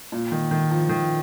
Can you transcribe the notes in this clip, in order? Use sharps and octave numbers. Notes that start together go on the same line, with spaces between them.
A#2
D#3
D#3
F3
D#3